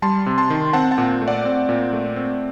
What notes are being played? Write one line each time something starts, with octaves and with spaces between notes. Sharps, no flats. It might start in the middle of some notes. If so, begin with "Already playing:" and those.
G3 A5 C6
C3
A5 C6
D#3
C4 F#5 A5
F#5 A5
A#2
A3
D5 F#5
C4
A#2
A3
C4